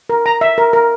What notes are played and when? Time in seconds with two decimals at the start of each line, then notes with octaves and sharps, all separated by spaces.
0.09 A#4
0.26 A#5
0.41 E5
0.58 A#4
0.73 A#4